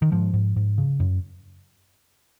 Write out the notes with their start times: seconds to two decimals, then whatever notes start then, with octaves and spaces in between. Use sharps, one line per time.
0.02 D#3
0.12 G#2 F3
0.34 G#2
0.56 G#2
0.78 C#3
1.00 F#2